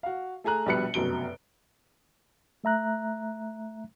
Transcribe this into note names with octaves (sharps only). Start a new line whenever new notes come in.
F#4 F5
A3 G#4 G#5 A#5 F#6
A#1 B2 G3 B4 F#6 C#7
F1 F#2 B2 D7 G7
A3 E5 A#5 F#6